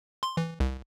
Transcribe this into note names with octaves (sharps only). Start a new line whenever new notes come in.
C6
E3
C2